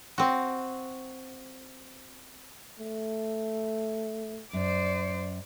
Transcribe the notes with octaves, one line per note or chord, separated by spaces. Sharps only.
C4 F#4
A3
F#2 C5 D5